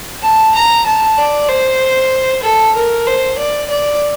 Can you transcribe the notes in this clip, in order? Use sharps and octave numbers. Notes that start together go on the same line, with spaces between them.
A5
A#5
A5
D5
C5
A4
A#4
C5
D5
D5